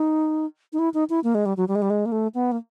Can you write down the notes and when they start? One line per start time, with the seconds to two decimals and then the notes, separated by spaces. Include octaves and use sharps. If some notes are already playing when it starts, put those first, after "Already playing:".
Already playing: D#4
0.73 D#4
0.79 E4
0.94 D#4
1.10 E4
1.24 A#3
1.35 G#3
1.46 G3
1.57 F#3
1.68 G3
1.75 G#3
1.82 G3
1.90 G#3
2.06 A#3
2.12 A3
2.34 B3
2.52 A#3